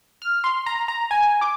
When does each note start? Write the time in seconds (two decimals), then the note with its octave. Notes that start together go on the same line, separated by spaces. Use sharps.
0.22 F6
0.44 C6
0.66 A#5
0.88 A#5
1.11 G#5
1.41 D6